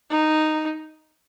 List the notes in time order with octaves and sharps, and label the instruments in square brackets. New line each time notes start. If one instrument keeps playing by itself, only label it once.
[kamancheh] D#4